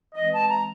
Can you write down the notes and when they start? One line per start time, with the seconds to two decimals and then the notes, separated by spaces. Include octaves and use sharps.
0.15 E3 G#3 C4 D#5
0.32 A5
0.49 A#5